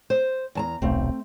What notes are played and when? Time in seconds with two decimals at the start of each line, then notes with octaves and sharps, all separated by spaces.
0.10 C5
0.55 E2 A5 A#5
0.82 D#1 B1 A3 C4